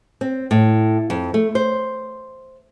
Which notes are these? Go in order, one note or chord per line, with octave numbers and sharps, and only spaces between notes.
C4
A2
F2
A3
C5